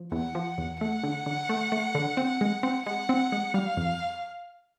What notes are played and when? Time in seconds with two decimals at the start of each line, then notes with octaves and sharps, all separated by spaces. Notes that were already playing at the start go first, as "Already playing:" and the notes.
Already playing: F3
0.12 E2 F#5
0.35 F3
0.58 E2
0.80 A3 F#5
1.03 D3
1.26 D3
1.49 A3
1.72 A3
1.95 D3
2.17 C4
2.41 G#3
2.63 C4
2.86 G#3 F#5
3.09 C4
3.32 G#3
3.54 G3 F5
3.77 F2